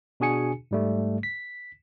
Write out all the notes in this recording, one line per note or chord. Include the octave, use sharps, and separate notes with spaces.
B2 D4 F#4 G#4 G#5 C#7
G#2 G3 A3
B6